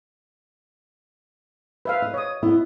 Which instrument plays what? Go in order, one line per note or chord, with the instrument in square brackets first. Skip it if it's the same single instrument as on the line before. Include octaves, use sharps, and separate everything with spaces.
[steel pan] B4 E5 F5
[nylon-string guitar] D#5
[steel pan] C#5 D#6
[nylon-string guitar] B3 E4 D#5